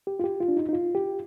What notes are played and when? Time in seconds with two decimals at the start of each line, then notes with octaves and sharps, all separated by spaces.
0.07 G4
0.20 F4
0.24 G4
0.41 F4
0.48 D4
0.57 D#4
0.69 D#4
0.73 F4
0.95 G4